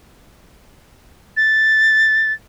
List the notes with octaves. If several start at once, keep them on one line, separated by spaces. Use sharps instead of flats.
A6